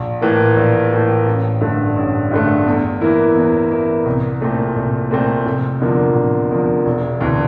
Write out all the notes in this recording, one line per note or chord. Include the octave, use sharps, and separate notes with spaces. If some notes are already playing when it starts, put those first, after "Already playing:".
Already playing: A#1
A2 E3 A#3
A#1
A2 E3 A#3
A1
G2 D3 A3
A1
G2 D3 A3
E2
E3 A#3 E4
E2
E3 A#3 E4
C2
A#2 A3 C4
C2
A#2 A3 C4
F1
E2 D3 F3 A#3
F1
E2 D3 F3 A#3
E1
D2 C3 E3